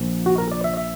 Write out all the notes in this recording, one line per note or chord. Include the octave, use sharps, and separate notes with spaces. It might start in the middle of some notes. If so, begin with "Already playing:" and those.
Already playing: A#1 A#2 F3
F#4
A#4
D5
E5
E5